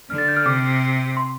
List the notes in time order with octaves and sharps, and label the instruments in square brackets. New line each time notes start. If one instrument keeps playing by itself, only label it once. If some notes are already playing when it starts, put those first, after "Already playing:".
[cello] D3 [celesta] F6
[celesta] A6
G6
F6
[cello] C3 [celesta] D6
[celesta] C6